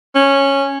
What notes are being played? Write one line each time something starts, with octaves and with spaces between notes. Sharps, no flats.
C#4